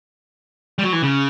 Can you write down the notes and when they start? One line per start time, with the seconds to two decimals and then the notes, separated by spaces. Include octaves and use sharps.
0.79 G3
0.83 F#3
0.93 E3
1.02 C#3